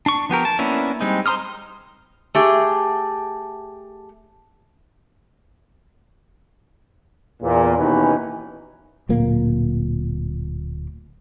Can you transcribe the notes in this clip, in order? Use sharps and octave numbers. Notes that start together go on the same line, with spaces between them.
D4 C#6
F3 B3 G4 A#4
A5
A#3 B3 C#4 D4 E4
G3 G#3 C4 D#4
C5 A#5 C6 D#6 F6
A3 G4 G#4
E2 A#2
D#2 B2 E3 C#4 D#4 B4
D1 A#2 A#3